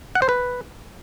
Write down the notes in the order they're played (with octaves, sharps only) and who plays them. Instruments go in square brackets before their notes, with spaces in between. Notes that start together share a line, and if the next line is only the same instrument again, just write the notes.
[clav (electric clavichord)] F#5
C5
B4